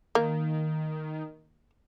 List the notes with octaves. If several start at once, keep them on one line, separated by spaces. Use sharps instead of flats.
D#3 A#3